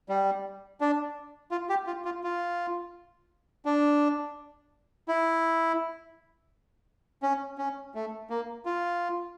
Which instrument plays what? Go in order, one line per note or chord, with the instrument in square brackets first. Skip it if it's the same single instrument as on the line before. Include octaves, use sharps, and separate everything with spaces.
[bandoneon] G3
D4
F4
G4
F4
F4
F4
D4
E4
C#4
C#4
A3
A#3
F4